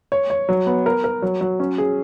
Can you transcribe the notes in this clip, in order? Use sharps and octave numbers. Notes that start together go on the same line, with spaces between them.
C#5
C#5
F#3
B3
A#4
A#4
F#3
F#3
C#4
G#4